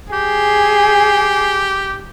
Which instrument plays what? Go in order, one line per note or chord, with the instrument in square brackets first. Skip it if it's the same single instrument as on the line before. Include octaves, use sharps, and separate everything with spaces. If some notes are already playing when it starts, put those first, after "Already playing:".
[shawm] G4 [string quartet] G#4